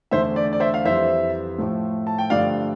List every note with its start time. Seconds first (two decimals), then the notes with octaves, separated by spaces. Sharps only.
0.11 E2 D3 A3 C5 E5
0.36 D5
0.53 D5
0.60 C5 E5
0.74 F5
0.85 F2 E3 G3 C5 E5
1.58 A2 F3 A3
2.07 A5
2.18 G5
2.30 G2 D3 F3 A3 D5 F5